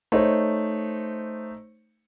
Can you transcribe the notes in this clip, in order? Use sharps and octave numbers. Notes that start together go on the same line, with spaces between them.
A3 D#4 C5 C#5